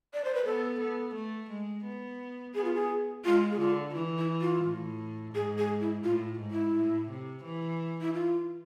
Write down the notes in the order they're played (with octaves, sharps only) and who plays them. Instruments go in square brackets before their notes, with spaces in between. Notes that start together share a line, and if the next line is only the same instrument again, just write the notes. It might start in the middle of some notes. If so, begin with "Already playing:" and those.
[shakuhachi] D5
C5
B4
[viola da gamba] B3 [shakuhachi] A4
[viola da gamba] B3
A3
G#3
B3
[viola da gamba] B3 [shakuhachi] G#4
[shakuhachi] F4
G#4
[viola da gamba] G#3 [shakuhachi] F4
[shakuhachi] G#4
[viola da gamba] D3 [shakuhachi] F4
[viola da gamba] E3 [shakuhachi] E4
[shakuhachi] E4
F4
[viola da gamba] A2
[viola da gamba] G#2 [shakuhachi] G#4
[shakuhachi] G#4
E4
[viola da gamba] A2 [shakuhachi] F4
[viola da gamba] G#2
[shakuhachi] E4
[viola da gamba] A2
C3
E3
[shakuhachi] E4
F4